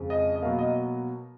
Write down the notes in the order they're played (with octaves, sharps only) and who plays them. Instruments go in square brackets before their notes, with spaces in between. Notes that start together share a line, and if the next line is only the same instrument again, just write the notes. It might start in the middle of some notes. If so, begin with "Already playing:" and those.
Already playing: [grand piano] F2 C#3 G#3
D#5
D#5
B2 F#3 A#3 F5
D#5